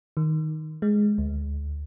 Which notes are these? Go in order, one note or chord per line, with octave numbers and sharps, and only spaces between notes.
D#3
G#3
D2